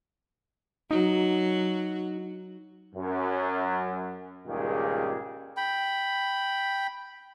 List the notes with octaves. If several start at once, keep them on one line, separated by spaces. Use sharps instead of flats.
F#3 D#4 F#4
F#2
C#2 G2 A#2 D#3 G4 G#4
G5 B5